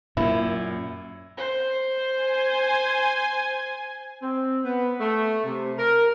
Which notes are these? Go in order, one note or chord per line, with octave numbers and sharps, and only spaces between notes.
F#2 A#2 A#3 E4
C5
G#5
C4
B3
A3
C3
A#4